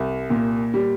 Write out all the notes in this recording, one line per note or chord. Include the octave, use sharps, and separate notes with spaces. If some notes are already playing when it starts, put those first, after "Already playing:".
Already playing: C2
A#2
G3